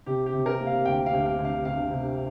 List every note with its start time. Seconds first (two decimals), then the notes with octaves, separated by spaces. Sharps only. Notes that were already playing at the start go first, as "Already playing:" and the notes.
0.06 C3 G4
0.26 G4
0.34 C3
0.46 A#4
0.60 A#3
0.67 F5
0.85 D2 G5
1.06 F5
1.13 D2
1.26 F5
1.39 D2
1.45 F5
1.65 D2 F5
1.91 C3